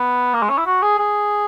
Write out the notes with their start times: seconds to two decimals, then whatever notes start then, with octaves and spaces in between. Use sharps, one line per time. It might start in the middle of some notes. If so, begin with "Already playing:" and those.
Already playing: B3
0.34 A#3
0.42 G#3
0.49 C#4
0.58 E4
0.66 F#4
0.82 G#4
0.99 G#4